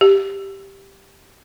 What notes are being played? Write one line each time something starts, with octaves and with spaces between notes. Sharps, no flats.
G4